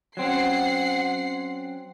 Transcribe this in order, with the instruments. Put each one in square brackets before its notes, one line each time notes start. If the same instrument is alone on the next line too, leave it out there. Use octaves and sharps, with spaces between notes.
[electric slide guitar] F#3 C4 C#4 [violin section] F#5 C7